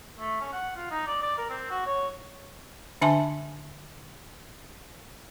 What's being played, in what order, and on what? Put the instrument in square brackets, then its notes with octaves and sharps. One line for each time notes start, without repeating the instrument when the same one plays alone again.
[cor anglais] A3
C#4
F#5
F4
D#4
D5
D5
A#4
C4
F#4
C#5
[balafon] D3 D4 E5 G#5 A5 C6